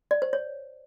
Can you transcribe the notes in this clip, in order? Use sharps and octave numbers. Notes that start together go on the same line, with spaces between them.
D5
C5
C#5